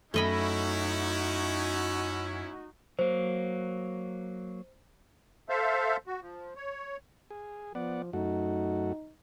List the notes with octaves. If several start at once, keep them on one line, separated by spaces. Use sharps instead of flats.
F#2 A3 C#4 D#4 E4 F#4 D#5 B5
F#3 A#3 C5
A4 C5 E5 F5
F#4
F3
C#5
G#4
F3 B3 D5 F#5
F#2 A3 D#4 F#4